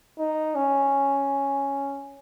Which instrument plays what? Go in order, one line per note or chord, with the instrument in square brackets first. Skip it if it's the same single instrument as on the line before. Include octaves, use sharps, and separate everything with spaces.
[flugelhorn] D#4
C#4